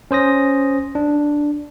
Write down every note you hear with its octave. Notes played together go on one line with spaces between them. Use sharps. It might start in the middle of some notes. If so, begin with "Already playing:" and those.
C#4 C5 D#6 A#6
D4